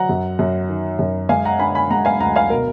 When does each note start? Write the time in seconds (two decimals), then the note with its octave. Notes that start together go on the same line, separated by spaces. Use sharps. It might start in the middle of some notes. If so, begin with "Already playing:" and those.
Already playing: F#3 F#5 A#5
0.09 F#2
0.39 F#2
0.69 D#3
0.99 F#2
1.29 G#3 F5 G#5
1.45 F#5 A#5
1.59 D4 G#5 B5
1.75 G#5 B5
1.90 G#3 F#5 A#5
2.05 F5 G#5
2.20 D2 F#5 A#5
2.36 F5 G#5
2.50 B2 A#4